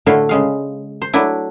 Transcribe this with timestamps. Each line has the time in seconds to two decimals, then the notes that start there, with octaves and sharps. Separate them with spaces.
0.06 A2 D3 A3 E4 F#4 F5
0.29 C#3 G#3 F5
1.02 C5
1.14 F#3 A3 D4 E4